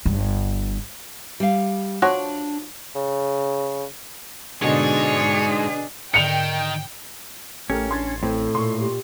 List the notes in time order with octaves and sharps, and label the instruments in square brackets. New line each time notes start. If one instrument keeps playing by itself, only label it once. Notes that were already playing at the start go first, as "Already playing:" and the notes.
[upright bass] G1 G2
[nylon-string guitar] G3 F5
[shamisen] F3 F#4 C#5 [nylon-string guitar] D4
[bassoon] C#3
[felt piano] B2 D3 [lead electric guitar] G#3 D#4 [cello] D4 G#4 [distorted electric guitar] C#5
[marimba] G#2 D3 [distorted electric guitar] D#3 [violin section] G5 [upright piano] C#7 F7
[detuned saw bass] A1 [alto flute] A3 [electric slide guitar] C#4 [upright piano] G4 A4 A#4
[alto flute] D4 [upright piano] C6 G#6 A6
[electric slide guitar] A2 [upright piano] C4 [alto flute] A4
[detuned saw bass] A#2 [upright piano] C6 C#6
[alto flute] G4